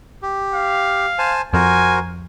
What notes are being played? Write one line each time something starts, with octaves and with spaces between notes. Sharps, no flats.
G4
F5
C5 G#5 A5
F2 F#4 A#4 C5 G#5